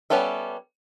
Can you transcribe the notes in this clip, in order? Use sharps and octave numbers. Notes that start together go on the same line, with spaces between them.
G3 B3 C#4 A4 E5